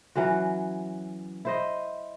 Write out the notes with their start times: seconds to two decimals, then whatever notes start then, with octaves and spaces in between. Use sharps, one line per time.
0.15 E3 F#3 C#4 F#4
1.45 E4 C5 D#5